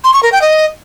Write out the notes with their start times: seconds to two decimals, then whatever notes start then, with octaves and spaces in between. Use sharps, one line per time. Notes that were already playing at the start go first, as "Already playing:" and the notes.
0.04 C6
0.13 C#6
0.23 A#4
0.32 G5
0.42 D#5